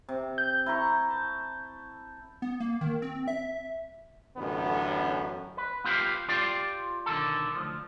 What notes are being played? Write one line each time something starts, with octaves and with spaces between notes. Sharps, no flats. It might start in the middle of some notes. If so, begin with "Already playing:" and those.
C3
G6
E4 A#5 C#6
A5
B3
A#3
D#3
C4
E5
A1 F#2 D3 B3
B4
B3 F4 G4 B4 F5
F4 G4 D5 F5 G5
B1 D3 D#3 A4
D2 F3